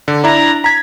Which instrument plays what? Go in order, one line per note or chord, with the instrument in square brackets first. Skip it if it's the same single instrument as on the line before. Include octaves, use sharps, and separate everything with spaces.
[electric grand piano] D3
[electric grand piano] D4 E4 [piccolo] A#5
[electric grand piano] A#5 G#6 [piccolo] B6